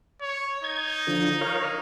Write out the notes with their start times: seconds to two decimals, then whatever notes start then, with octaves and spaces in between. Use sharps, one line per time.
0.21 C#5
0.64 D#4 G#6
1.07 D3 F3
1.41 A#4 C#5 F5